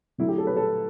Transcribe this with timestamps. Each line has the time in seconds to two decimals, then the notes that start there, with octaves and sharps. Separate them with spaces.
0.18 D3 F#3 A3 E4
0.28 G4
0.38 A4
0.47 B4
0.57 A4